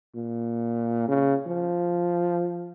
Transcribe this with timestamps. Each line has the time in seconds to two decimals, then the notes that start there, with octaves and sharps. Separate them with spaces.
0.15 A#2
1.08 C#3
1.47 F3